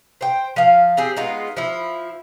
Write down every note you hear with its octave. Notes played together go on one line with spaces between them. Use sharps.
C5 G5
F3 F5
C4 G4 G#4
G#3 B3 D#4 F4
F3 E4